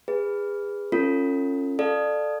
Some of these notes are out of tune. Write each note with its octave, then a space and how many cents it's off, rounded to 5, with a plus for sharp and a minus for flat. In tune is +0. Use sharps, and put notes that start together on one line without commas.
G#4 -25 B4 +0
C#4 -15 F4 -15 A4 +40
A4 +0 D5 +20 F5 +0